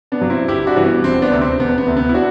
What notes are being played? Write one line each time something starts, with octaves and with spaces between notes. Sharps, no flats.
B3 D4
G2 F#3
C4 E4
G1 E4 G4
D4 F#4
G2 E3 G3
B3
E1 C4
B3 D4
D2 C3
C4
E1 B3
B3
D2 C3
B3
E4
D4 F#4